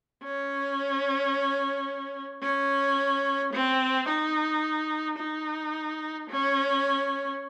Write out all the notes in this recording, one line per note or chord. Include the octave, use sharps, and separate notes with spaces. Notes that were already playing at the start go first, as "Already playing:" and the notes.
C#4
C#4
C4
D#4
D#4
C#4